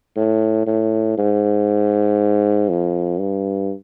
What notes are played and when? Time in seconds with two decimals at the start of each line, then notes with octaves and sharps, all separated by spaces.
0.16 A2
0.67 A2
1.18 G#2
2.69 F2
3.19 G2